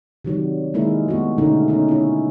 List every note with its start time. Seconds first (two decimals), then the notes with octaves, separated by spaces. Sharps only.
0.25 C3 D#3 F#3 G3
0.74 D#3 G#3 A#3 E4 A#4
1.08 A3 B3 F#4
1.38 B2 D3 A3 C#4 D#4 A#4
1.68 C#4 D#4
1.89 C#4 E4